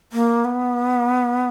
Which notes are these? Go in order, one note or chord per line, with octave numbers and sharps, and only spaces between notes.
A#3
B3